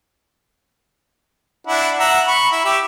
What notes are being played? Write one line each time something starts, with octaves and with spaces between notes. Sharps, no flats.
D4 E4 F#5
E5 F#5 A#5
B5 C#6
E4 E5
G4 E5